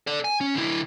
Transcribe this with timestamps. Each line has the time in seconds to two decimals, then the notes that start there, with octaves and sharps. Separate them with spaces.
0.07 A4 D5
0.24 G#5
0.41 C#4
0.55 D3 E4